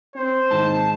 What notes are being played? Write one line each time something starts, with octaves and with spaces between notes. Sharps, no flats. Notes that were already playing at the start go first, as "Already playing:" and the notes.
C4 C5
G#2 D#3 G#3 A5